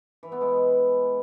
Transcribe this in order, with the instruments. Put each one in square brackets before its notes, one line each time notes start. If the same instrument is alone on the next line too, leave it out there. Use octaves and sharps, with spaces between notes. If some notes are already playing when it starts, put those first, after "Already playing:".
[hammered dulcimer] E3
B3
G#3